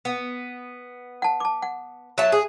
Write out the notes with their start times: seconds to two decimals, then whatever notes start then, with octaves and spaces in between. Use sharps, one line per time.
0.05 B3
1.22 F#5 A5
1.40 A5 D6
1.62 F#5
2.18 F#3 E5 A5
2.32 G#4